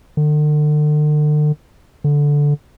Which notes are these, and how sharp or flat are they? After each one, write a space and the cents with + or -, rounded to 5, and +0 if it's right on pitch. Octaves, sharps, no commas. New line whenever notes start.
D3 +40
D3 -10